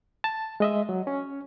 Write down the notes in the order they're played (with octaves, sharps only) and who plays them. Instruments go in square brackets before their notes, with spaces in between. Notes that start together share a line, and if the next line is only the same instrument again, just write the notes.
[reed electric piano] A5
G#3 D#5 E5
F#3
C#4